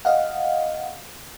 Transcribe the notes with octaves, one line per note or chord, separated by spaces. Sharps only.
D#5 F5 F#5